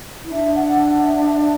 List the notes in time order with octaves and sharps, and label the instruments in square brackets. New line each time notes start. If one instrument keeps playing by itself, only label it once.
[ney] E4
[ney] D4 [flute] E5
[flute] F#5
F#5
E5
E5
D5